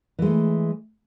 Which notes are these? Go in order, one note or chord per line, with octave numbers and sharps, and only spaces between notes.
E3 G#3 A3